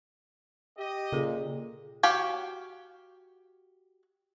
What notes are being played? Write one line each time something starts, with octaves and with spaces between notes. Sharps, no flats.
G4 D#5
A#2 C#3 G#4 A4
F#4 G4 C#5 F5